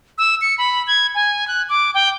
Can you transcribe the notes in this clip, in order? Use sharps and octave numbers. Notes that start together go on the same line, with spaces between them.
E6
C#7
B5
G#6
G#5
F#6
D6
G5